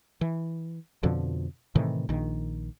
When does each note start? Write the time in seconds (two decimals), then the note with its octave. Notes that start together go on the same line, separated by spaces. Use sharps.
0.21 E3
1.03 F2 B2 D3 F3
1.75 A2 C3 D#3 E3
2.09 A#1 D#3